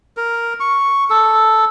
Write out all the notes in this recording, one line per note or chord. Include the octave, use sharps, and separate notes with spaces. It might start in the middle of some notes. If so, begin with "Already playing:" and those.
A#4
C#6
A4